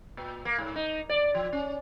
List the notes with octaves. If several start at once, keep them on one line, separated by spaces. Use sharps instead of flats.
A#2
A#3
G#2
D#4
D5
F3
C#4